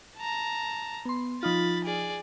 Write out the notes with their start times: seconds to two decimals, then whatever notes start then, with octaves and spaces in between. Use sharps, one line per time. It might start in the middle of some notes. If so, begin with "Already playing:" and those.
0.17 A5 A#5
1.05 B3 C6
1.43 F3 D#4 F4 B5 A6
1.84 G#4 D5